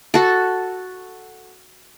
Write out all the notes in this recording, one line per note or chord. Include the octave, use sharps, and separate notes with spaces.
F#4 A4